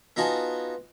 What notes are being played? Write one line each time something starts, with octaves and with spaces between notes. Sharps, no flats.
B3 D#4 F4 F#4 G#5 A5